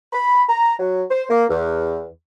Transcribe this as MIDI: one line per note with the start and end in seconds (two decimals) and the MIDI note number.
0.12 0.43 83
0.49 0.74 82
0.80 1.03 54
1.10 1.23 72
1.30 1.45 58
1.50 2.06 40